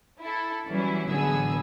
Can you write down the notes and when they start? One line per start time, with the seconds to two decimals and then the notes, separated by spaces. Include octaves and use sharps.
0.22 E4 A4
0.70 E3 F#3 G3 C#4 E4
1.09 A1 D3 F#3 B3 G#4 E6